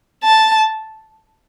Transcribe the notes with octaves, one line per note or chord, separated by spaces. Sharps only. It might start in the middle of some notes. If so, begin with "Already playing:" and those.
A5